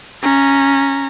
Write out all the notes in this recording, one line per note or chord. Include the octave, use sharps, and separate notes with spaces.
C#4 A#5